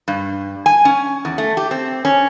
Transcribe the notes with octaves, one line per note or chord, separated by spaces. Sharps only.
G2
G#5
C#4
E2
A3
G4
C4
C#4